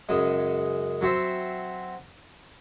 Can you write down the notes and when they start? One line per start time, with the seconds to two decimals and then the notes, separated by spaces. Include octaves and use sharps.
0.09 F#2 C#3 G#3
1.01 F#3 C4 F#4 C5 E5